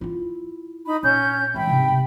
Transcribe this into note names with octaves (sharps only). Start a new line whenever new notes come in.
E4 F4
D#4 B5
A#1 C#4 G6
E3 G#3 E5 G5 B5
G#2 C3
C3